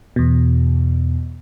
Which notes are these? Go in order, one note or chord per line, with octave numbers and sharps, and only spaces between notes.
E2 B2